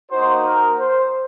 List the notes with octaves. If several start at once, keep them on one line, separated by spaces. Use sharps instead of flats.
A#3 D#4 F#4 C5
A#4
C5